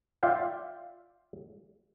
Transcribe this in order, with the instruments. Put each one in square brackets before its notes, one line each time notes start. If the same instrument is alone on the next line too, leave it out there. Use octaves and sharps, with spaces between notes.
[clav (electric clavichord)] F4 D5 E5 F5 G5